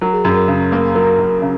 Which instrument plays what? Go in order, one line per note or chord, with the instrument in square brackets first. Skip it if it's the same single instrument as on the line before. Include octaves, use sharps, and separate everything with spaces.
[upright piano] F#3 [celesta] A#4
[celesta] G#4
[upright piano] F#2 [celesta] G#4
[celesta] A#4
[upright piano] C#3
A#3
[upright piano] F#3 [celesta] A#4
[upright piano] F#2
C#3